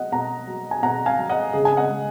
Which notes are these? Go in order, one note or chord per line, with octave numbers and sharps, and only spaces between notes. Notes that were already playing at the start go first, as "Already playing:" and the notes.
Already playing: B2 F#3 D#5 F#5
B2 F#5 A#5
F#3
G#5
B2 F#5 A#5
F5 G#5
F#3
D#5 F#5
C#3 G#4
G#5
D#5 F#5
G#3